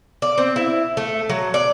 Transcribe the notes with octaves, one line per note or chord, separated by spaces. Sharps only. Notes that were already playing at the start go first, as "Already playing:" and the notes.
D5
C4
E4
A3
F#3
D5